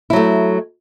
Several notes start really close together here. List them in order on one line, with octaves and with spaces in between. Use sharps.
E4 F#3 A3